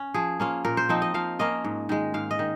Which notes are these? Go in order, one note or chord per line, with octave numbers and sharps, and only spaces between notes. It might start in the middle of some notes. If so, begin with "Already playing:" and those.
Already playing: C#4
F3 G#4
A#3 C#4 F4
A#2 A#4
C5
F3 C4 D#4
D#5
F3 F5
A#3 C#4 F4 D#5
G#2
D#3 G#3
G#2 F5
D#5
D#3